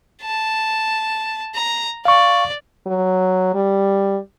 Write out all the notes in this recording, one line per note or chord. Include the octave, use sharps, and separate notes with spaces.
A5
A#5
D5 F5 C#6
F#3
G3